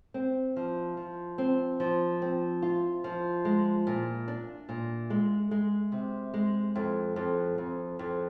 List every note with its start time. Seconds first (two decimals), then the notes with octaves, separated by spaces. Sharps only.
0.14 C4
0.56 F3
0.97 F3
1.38 C4
1.80 F3
2.22 C4
2.62 F4
3.04 F3
3.45 G#3
3.87 A#2
4.28 D4
4.69 A#2
5.10 G#3
5.51 G#3
5.92 C3
6.34 G#3
6.76 F2
7.16 F2
7.58 F2
7.99 F2